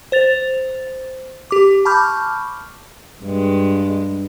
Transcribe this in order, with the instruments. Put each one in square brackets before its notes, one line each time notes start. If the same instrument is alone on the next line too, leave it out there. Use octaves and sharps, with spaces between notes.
[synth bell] C5 A6 F7
G4 D6
A5 B5 C#6 D6 F6 G6
[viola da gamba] G2 G#3